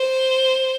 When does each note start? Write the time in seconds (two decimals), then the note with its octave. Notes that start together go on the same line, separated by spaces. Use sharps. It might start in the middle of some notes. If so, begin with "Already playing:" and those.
Already playing: C5